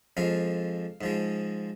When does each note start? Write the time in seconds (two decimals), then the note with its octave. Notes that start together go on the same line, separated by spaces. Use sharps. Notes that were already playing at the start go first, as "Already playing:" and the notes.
0.17 F2 F3 G#3 F5
1.01 G#2 F3 G#3